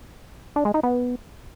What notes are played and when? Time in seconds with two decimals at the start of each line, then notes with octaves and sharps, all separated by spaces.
0.56 D4
0.65 G#3
0.74 D#4
0.83 B3